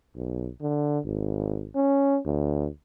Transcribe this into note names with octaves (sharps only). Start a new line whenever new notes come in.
B1
D3
G#1
C#4
D2